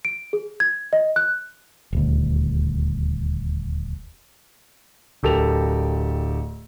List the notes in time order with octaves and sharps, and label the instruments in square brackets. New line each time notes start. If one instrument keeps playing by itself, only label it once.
[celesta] D7
G#4
G#6
D#5
F#6
[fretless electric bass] D#1 D2
[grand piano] D1 G4 A4 A#4 F7